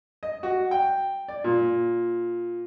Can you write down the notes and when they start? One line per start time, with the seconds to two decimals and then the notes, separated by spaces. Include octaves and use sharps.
0.23 D#5
0.43 F#4
0.71 G5
1.28 D5
1.44 A#2